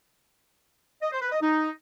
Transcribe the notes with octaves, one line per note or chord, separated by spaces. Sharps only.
D#5
C5
B4
D#5
D#4